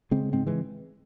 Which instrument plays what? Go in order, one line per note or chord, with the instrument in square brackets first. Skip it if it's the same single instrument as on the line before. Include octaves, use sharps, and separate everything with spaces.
[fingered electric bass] C#3 G#3 C4
G#2 G#3 C4
E3 G#3